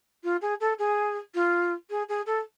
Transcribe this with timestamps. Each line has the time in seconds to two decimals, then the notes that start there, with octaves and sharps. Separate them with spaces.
0.24 F4
0.42 G#4
0.61 A4
0.79 G#4
1.35 F4
1.90 G#4
2.09 G#4
2.26 A4